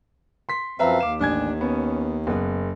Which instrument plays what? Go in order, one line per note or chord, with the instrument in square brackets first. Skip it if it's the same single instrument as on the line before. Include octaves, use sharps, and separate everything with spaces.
[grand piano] C6 B6
[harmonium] F#2 F3 C4 [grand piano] B4 E5 A#5 [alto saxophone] F5
[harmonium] D#2 [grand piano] D6 E7
[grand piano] A1 G#5 G#6 [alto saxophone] D4
[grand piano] B3 [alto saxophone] C#4
[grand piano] F#1 [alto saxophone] B3